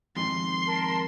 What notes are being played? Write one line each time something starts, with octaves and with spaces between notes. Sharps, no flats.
F2 G#2 D#3 C6
A#4 A5